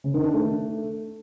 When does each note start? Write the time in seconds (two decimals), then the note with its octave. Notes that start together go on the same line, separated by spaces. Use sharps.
0.04 C#3
0.14 D#3
0.24 D4
0.34 A3